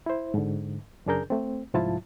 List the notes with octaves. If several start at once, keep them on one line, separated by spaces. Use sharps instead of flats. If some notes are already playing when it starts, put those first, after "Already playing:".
E4 C5
G#2 D3
F#2 C#3 D4 G#4 A#4 G6
A3 C4
C2 G#2 F3 E4 F4 A5